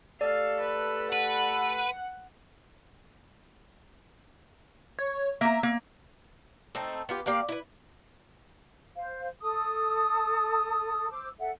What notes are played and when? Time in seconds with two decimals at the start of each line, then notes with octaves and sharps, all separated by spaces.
0.21 A3 G4 A4 D5 F5
0.61 B4
1.12 B4 F#5
4.99 C#5
5.41 A#3 E5 A#5
5.63 A#3
6.75 A3 C4 D#4 A4
7.09 B3 F4 G4
7.26 A#3 G4 D5 F5
7.49 E4 B4
8.96 C5 F5
9.43 A4 A5 D#6 E6
11.11 C5 D6 E6
11.39 A4 E5 F#5